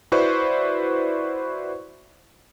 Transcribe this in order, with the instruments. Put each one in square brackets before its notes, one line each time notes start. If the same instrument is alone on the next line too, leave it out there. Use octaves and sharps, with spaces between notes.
[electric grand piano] E4 F#4 B4 C5 D5 C#6